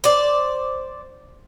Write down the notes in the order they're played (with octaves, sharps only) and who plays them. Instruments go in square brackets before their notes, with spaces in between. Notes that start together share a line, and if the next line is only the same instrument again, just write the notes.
[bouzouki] C5 D5